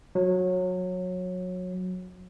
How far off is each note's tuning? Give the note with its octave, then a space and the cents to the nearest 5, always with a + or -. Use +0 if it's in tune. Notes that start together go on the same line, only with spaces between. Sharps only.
F#3 -20